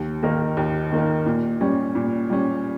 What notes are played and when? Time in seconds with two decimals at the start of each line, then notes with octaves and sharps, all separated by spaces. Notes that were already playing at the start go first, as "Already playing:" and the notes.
Already playing: D#2
0.23 D#3 A#3 D#4 A#4
0.57 D#2
0.92 D#3 A#3 D#4 A#4
1.26 A#2
1.61 G3 C#4
1.95 A#2
2.30 G3 C#4